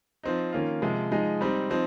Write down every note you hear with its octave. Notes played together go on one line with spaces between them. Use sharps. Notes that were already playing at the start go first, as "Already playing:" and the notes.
F3 C4 D#4
D#3 A#3 C#4 F4
C3 F3 G#3
F3 G#3 D#4
G3 C4 D#4
F3 C4 D#4